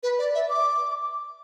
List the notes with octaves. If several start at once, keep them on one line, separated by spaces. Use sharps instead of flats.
B4
D5
E5
D6